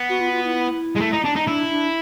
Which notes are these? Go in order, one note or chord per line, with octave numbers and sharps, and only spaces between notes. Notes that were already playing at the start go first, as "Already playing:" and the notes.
Already playing: B3
F#4
F4
F4
E4
G#3
A3
D#4
D4
D#4
D4 E4
D4